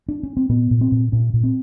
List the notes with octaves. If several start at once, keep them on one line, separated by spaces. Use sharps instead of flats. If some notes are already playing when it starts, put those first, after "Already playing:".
D4
C#4
C4
A#2 B3
A#2
C4
A#2
A#2 C#4
A#2
C4